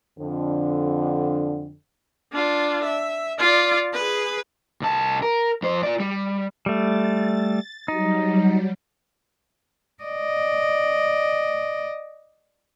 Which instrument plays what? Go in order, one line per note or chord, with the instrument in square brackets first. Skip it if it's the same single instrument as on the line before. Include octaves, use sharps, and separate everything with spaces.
[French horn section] F2 D3
[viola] D4 F4
E5
F4 D5
G#4 B4
[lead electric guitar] C2 A5
A#4
F2 C5
F4 D5
G3
[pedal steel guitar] G3 A3 [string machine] A6
[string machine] F#3 G3 [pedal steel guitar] D#4
[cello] D5 D#5